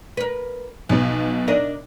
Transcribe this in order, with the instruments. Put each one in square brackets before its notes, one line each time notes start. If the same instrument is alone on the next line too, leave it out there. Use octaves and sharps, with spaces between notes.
[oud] A#4 B4
[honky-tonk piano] B1 B2 [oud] F3
[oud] D4 A#4 D#5